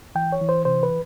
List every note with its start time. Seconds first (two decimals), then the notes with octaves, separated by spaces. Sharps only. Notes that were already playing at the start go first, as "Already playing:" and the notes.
0.15 E3 G5
0.32 C#5
0.41 E3
0.49 C5
0.65 C3 C5
0.83 B4